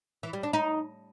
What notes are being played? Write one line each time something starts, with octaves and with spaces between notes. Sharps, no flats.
E3
G3
D4
D#4